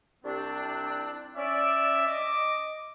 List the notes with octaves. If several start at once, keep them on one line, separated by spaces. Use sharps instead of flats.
C2 C4 D4
C#4 D5 E5
D#5 D6